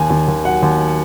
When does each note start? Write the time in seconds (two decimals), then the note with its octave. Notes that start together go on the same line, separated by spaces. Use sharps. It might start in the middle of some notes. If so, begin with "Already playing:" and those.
Already playing: D#2 G#5
0.10 D#2
0.28 D#2
0.44 F#3 F#5
0.62 D#2